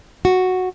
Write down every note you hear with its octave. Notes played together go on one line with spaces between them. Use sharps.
F#4